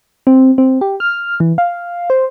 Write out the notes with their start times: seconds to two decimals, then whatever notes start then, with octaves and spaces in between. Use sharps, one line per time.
0.27 C4
0.58 C4
0.81 G4
1.00 F6
1.40 E3
1.58 F5
2.10 C5